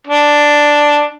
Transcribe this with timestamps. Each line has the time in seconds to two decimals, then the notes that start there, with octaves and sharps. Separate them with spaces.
0.07 D4